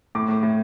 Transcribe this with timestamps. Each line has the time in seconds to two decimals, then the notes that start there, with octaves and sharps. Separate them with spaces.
0.15 A2 D6
0.29 A2
0.43 A2